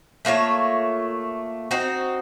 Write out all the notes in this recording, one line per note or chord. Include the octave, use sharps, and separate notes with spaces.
A3 A#3 F4 C#5
C4 D#4 F#4